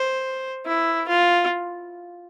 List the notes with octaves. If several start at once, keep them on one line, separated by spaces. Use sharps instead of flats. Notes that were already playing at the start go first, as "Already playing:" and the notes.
Already playing: C5
E4
F4